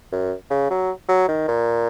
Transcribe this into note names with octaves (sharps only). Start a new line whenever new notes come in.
F#2
C#3
F#3
F#3
D#3
A#2